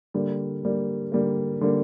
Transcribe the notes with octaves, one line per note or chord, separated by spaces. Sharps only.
D3 G3 A#3
D3 G3 A#3
D3 G3 A#3
D3 G3 A#3